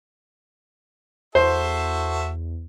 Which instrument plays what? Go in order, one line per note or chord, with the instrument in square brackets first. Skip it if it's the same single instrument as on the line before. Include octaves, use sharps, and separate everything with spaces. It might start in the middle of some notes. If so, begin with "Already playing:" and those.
[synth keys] E2 [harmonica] F#4 A4 E5 [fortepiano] C5